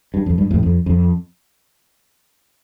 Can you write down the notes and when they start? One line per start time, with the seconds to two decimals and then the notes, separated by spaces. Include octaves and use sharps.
0.14 G2
0.26 F2
0.38 G2
0.51 F2 A2
0.63 F2
0.86 F2